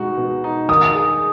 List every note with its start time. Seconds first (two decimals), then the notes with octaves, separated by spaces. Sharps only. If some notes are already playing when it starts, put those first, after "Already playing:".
Already playing: B2 G#3 D#4 F#4
0.17 B2
0.44 D#4
0.68 D#3 D#6
0.95 G#4